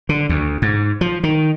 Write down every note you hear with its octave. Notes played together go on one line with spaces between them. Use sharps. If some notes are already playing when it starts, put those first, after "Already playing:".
D3
D2
G#2
F3
D#3